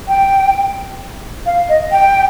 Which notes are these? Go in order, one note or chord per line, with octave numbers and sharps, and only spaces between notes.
G5
F5
D#5
G5